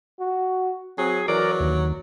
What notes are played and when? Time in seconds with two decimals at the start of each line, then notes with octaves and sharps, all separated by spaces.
0.20 F#4
0.98 F#3 C4 G#4
1.28 E3 F#3 A#4 D5
1.60 D#2